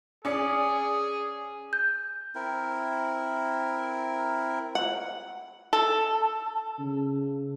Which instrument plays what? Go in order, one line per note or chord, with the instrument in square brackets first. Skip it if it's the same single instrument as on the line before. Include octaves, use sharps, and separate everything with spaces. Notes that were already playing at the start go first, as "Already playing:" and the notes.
[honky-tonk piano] C#4 D5 C#7 [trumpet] G#4
[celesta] G6
[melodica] C4 E4 A#4
[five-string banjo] F#5
[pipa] A4
[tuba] C#3